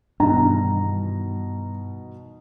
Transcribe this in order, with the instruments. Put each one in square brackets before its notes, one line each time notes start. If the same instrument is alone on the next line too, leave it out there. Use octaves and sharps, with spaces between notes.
[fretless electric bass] G2 [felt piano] B2 D#3 E3 [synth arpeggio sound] D4 D#4 [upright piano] A#5